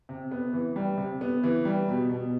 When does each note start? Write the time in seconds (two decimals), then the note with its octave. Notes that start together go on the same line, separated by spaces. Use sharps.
0.09 C3
0.31 B3
0.53 E3
0.76 G3
0.97 C3
1.21 B3
1.43 E3
1.65 G3
1.88 B2
2.10 B2